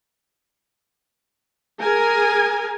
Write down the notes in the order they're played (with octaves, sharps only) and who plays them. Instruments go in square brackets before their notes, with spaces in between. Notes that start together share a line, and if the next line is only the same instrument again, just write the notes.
[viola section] G#4 A#4 G#5